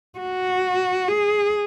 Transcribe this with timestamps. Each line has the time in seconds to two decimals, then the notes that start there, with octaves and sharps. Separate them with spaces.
0.19 F#4
1.08 G#4